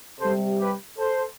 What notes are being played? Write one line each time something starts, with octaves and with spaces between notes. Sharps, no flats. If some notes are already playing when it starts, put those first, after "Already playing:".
C3 G3 A4 C5
G4 B4
A4 C5